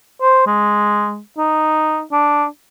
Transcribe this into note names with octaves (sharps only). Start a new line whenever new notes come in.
C5
G#3
D#4
D4